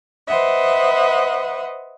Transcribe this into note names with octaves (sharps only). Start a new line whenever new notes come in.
B4 C5 D#5 E5 F#5